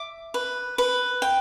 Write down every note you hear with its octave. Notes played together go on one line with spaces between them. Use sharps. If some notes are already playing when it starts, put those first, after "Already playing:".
Already playing: E5 D6
B4
B4
G5